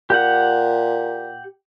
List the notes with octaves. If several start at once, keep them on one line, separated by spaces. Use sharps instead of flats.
A#2 G4 F#5